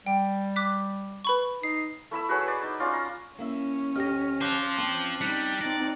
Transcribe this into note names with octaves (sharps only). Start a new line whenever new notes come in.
G3 G5
D6 F#6 B6
B4 B5 C#6
D#4 C7
A3 E4 B5 E6
F#4 G#4 B4 C#5
D5
D#4
C#4 F4 D5 F5
A#5
A#3 C#4 E4 E5
D2 G4 D#5 F6 A#6
F4 C5 A5 D6 F#6
C4 C#4 A5 F#7
G3 D#4 F#6 C#7
C4 D#4 D5 A#6